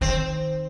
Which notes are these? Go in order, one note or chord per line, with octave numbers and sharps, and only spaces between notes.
D#3 C4